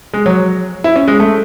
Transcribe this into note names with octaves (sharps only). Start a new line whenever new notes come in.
G#3
F#3
E4
C#4
G#3
A3